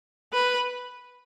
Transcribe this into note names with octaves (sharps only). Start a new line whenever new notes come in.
B4